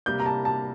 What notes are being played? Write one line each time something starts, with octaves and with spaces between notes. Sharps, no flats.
C3 G3 A#3 G6
A#5
A5
A5